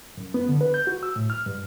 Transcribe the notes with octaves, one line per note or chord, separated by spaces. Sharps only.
F#2
B3
D3
B4
G6
F#4
E6
A2
F6
G2